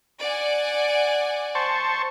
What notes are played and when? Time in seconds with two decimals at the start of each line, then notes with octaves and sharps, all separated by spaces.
0.20 D5 F#5 G#5
1.55 C5 A5 C#6